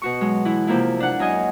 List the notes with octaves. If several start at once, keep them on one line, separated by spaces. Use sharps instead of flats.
B2 F#4 C#6
F#3 G#3
E3 E4
C3 F3 A#3 E4
D4 F#5
F#2 F#3 D#5 G#5